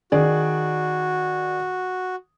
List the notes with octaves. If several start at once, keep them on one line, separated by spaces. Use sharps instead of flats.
D#3 F#4 G#4 D5